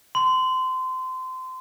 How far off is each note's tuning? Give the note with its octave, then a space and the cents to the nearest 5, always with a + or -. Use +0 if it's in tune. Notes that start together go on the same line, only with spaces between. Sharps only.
C6 -25